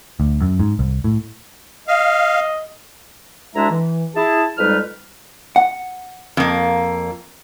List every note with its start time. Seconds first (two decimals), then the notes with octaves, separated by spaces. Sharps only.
0.20 D2
0.42 F#2
0.59 G#2
0.79 C2
1.04 A2
1.88 D#5 F5
3.55 D2 G#3 D4 E4 E5 A#5
3.70 E3
4.16 E4 G#4 A5
4.58 F2 G3 G#3 D#4 B4 F6
5.56 F#5
6.37 F2 A#3